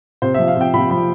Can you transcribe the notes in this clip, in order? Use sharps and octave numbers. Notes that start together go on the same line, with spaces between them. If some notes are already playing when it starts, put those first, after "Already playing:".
C3 C5
F3 E5
F5
C3 G5
C3 B5
F3 B5